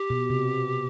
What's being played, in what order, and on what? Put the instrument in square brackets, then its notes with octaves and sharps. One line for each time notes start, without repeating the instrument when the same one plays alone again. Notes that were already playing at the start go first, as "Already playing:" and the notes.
Already playing: [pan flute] G4
[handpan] B2
C3